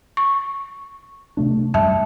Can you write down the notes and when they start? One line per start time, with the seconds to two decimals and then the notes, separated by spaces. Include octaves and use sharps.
0.17 C#6
1.37 C3 A3 D4
1.74 F#2 G3 E5 A5